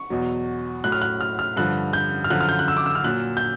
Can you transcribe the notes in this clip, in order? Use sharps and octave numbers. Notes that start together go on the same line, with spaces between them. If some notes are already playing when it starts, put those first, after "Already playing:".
Already playing: C#6
E2 B2 F#3
A2 F#3 F#6
F6
F#6
F6
F6
G2 D3 F3 F#6
G6
F6
F#2 D3 F3 F#6
F6
G6
F#6
E6
D6
E6
F6
A#2 F#3 F#6
G6